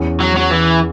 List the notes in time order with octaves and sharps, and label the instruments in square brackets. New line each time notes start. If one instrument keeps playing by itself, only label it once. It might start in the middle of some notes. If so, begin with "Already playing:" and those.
Already playing: [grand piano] E2 E3 C#4
[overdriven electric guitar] F#3
F#3
E3